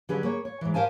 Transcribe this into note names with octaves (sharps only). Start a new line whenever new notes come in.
D3 F#3 C#4 G4 G#4 B4
A#3 G#4 C#5
C#5
G#2 E3
G4 A#4 C5 F5 G#5 A5